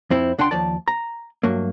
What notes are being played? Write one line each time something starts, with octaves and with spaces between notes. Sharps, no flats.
F2 C4 E4
C#2 D4 F#5 G5 C6
D#2 F3 D5 A5
A#5
G2 F#3 A3 A#3